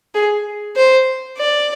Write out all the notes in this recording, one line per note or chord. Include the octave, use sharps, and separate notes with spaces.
G#4
C5
D5